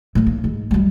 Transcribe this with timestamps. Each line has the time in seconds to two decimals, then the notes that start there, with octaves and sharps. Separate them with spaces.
0.15 A2 G#3
0.27 A#3
0.44 G#2
0.71 F#2 G3